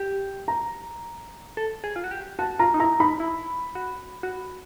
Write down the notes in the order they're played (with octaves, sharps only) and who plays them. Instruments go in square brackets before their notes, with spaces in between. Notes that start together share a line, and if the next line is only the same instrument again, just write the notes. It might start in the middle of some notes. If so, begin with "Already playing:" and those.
Already playing: [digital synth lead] G4
[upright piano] A#5
[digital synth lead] A4
G#4
F4
F#4
G4
[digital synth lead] F#4 [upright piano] A5
[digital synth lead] F4 [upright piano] A#5
[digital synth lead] D#4
[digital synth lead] E4 [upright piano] A#5
[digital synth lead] D#4 [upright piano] B5
[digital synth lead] E4
F#4
F#4